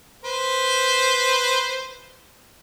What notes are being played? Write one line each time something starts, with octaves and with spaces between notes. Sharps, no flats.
B4 C5